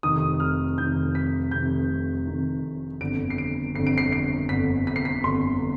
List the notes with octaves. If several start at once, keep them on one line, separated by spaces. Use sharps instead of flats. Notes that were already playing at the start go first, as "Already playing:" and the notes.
F1 F2 D#3 D#6
F6
F1 F2 D#3 G6
B6
F1 F2 D#3 G6
F1 F2 D#3
G1 F2 D3 D7
C7
D7
G1 F2 D3 C7
D7
C7
C7
G1 F2 D3 B6
B6
C7
B6
G1 F2 D3 C6